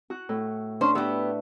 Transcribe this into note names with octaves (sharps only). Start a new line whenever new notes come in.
F#4 F#6
A2
C#4 D4 C5
B3 F#4 G4 B4 E5